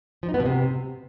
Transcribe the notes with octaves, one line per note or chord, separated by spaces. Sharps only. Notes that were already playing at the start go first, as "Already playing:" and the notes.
F3
D#4
B3
B2
C3